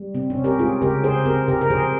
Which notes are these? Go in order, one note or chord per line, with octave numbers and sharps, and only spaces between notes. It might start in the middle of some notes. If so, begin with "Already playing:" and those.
Already playing: G3
C3 C4
C#4
C3
G4 A#4
G#3 F4 G#4
C#3 G4 A#4
C#3 G#4 C5
C4 G4 A#4
C3 G4 A#4
A#4
F3 G#4 C5